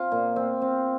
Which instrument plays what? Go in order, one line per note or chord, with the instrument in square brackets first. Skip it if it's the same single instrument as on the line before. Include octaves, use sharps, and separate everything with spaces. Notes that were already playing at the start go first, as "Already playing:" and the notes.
Already playing: [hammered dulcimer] C4 F4
A#2
C4
C4